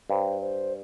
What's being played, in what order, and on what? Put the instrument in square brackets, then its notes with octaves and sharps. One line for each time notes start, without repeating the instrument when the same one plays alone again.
[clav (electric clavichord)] G2 [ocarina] C5
[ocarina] C5